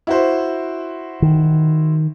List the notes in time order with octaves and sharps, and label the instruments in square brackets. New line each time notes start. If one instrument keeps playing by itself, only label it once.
[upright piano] E4 F#4 C5
[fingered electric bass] D#3